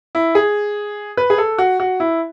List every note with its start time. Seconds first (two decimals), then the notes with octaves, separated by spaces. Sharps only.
0.15 E4
0.35 G#4
1.17 B4
1.30 G#4
1.38 A4
1.58 F#4
1.80 F#4
2.00 E4